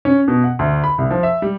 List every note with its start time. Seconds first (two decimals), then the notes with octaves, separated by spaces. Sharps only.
0.05 C#4
0.28 B2
0.44 F#5
0.59 D2
0.84 B5
0.98 C2
1.11 F3
1.23 E5
1.42 G3